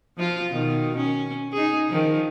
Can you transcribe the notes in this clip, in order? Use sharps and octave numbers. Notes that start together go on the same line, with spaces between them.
F3 F4
B2 D#3
C#4
D#4 G#4
D#3 F3